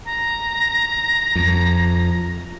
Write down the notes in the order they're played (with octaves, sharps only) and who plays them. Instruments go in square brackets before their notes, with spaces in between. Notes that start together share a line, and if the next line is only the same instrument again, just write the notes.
[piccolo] A#5
[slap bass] F2